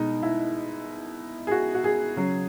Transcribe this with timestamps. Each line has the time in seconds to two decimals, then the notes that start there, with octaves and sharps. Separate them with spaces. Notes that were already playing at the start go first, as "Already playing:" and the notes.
Already playing: B2 G#3 D#4
0.22 E4
1.47 G#4
1.51 F#4
1.75 F#4
1.84 G#4
2.16 C#3 F#3